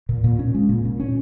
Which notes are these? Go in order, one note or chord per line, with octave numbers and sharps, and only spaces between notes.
A#2
A#2
C#4
G#3
A#2
A#2
C#4